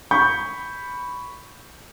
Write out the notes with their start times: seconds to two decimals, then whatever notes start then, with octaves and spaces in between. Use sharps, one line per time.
0.11 B5 C#6 G6